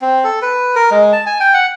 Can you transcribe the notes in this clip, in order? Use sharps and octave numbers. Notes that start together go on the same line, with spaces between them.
C4
A4
B4
A#4
G#3
A5
G#5
G5
F#5